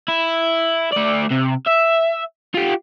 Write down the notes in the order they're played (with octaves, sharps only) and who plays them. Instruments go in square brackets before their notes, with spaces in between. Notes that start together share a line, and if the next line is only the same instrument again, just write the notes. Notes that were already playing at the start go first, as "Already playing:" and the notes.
[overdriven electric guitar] E4
A3 D5
C3
E5
F4 G4